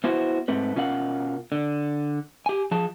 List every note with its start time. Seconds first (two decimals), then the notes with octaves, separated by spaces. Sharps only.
0.04 B3 E4 F#4 C5
0.48 G#2 A3 C4 B4
0.76 B2 C#4 F4 A#4 F5 F#5
1.52 D3
2.46 G4 G#5
2.71 F3 G#4 A5